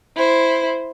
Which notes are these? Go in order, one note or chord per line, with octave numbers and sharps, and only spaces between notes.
E4 C5